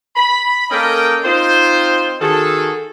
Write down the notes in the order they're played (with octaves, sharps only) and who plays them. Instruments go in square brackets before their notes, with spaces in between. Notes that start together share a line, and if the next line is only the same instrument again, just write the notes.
[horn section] B5
A#3 C#4 A4 A#4 D#5 G5
C4 D#4 F4 C5
D#3 F#4 G#4 A4